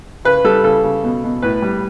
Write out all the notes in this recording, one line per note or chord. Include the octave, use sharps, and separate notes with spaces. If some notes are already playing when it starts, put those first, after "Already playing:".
C#3 B4
G3 A4
C#3 A4
C#3
B2
B2
A2 B4
G3